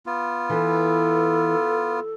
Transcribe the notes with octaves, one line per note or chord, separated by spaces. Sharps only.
B3 F4
E3 A4